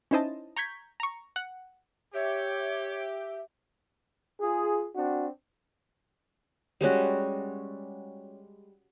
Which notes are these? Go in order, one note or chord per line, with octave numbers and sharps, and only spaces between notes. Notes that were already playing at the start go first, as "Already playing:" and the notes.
C#4 D#4 E4 C5 D#5 A5
A#5 C#6 G6 G#6 B6
A#5 C#6
F#5
G4 C#5 E5
F4 G#4
C4 D4 F#4
G3 G#3 C#4 F#4